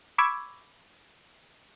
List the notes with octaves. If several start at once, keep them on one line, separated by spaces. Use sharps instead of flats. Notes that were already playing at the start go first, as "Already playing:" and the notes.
B5 C#6 D6 E6 G#6